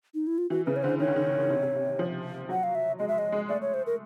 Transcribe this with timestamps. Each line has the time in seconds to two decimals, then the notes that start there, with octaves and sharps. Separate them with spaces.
0.14 D#4
0.27 E4
0.38 F4
0.50 E3 F#4
0.66 C#3 B4
0.76 C#5
0.83 D3 C5
1.00 D#3 C#5
1.08 D3
1.16 D#3
1.50 C3
1.63 C3
1.75 C3
1.99 F3
2.49 F#3 F#5
2.63 F5
2.75 E5
2.99 G#3 D#5
3.08 E5
3.18 D#5
3.32 G#3
3.49 A3 D5
3.62 C#5
3.74 C5
3.86 A#4